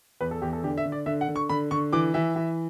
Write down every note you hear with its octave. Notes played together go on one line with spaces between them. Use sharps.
E2 B4
A4
E2 G4
A4
D3 G4
E5
D3
D5
D3 E5
F#5
D3
C#6
D3 B5
D3 C#6
E3 D6
E3 E5
E3